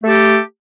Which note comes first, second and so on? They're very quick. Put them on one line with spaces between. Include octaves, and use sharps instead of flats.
A3 A4 G4